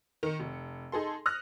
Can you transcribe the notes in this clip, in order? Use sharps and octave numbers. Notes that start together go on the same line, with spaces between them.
D#3 C#7
F1
D#4 G#4 A4 C6
D#6 F6 F#6 A#6